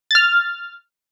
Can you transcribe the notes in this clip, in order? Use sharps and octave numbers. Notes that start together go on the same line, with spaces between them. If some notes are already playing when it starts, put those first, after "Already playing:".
F6 A6